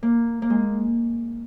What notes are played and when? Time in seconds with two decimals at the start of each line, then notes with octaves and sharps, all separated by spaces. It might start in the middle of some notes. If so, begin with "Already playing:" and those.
0.03 A#3
0.42 A#3
0.50 G#3